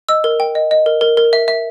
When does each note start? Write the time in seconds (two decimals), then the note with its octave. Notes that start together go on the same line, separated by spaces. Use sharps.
0.09 D#5 E6
0.24 A#4
0.40 G5
0.55 D#5
0.71 D#5
0.86 A#4
1.01 A#4
1.17 A#4
1.33 E5
1.48 E5